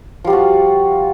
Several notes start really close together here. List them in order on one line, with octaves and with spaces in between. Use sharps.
F3 G3 F4 F#4